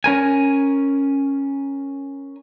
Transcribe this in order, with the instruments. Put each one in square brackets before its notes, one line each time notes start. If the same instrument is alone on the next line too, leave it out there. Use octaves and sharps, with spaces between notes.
[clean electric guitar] C#4 A#4 G#5